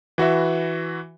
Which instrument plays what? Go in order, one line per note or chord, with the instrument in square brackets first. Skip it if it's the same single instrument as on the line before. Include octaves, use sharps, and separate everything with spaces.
[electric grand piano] E3 F#4 B4 E5